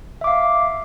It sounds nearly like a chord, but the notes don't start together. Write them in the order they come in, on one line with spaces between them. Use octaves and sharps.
E5 D6 F5